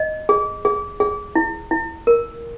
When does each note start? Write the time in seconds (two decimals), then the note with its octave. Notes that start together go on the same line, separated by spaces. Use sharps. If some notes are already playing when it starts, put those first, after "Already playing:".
Already playing: D#5
0.29 G#4
0.65 G#4
1.00 G#4
1.35 E4
1.71 E4
2.07 A#4